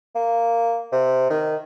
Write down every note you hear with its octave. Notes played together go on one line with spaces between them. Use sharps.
A#3
C3
D#3